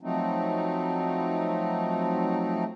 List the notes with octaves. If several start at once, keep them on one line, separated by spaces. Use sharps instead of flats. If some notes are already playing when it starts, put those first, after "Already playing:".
F3 F#3 A3 C4 D#4